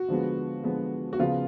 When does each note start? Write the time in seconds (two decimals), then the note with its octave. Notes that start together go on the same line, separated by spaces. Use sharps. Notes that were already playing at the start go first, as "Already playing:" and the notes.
Already playing: F#4
0.08 D3 F3 G#3 B3
0.64 D3 F3 G#3 B3
1.13 F#4
1.19 C#3 F3 B3 F4